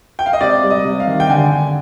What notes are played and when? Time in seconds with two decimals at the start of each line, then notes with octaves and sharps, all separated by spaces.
0.19 G5
0.26 F5
0.33 D#5
0.41 C3 D5
0.63 G3
0.70 D#5
0.85 C3
1.00 F5
1.07 D#3
1.20 G5
1.29 D3 G#5
1.52 D3